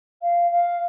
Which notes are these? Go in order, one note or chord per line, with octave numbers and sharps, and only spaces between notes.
F5
F5